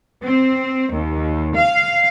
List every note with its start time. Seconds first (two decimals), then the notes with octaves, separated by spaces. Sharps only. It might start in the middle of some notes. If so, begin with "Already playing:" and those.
0.24 C4
0.92 D#2
1.56 F5